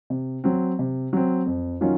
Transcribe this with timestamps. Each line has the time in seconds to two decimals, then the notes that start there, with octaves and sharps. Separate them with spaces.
0.10 C3
0.44 F#3 C4
0.79 C3
1.13 F#3 C4
1.46 F2
1.81 D#3 F#3 C#4 F4